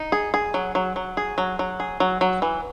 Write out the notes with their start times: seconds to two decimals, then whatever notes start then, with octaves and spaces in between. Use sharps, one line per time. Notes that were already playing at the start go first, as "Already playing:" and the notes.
Already playing: D#4
0.12 G#4
0.34 G#4
0.54 F#3
0.75 F#3
0.96 F#3
1.17 G#4
1.38 F#3
1.59 F#3
1.80 G#4
2.00 F#3
2.21 F#3
2.42 E3